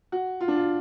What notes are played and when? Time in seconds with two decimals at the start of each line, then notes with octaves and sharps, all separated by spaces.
0.12 F#4
0.41 F4
0.48 D4
0.56 F4